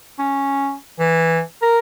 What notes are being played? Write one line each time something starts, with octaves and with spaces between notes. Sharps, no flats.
C#4
E3
A#4